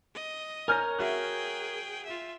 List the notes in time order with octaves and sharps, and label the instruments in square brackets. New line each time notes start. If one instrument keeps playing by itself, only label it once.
[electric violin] D#5
[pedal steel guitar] A#4 C#5 A#5 [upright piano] G#5 F6 G6
[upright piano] F#4 E5 F#6 [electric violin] G#4 G5
[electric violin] F4 E5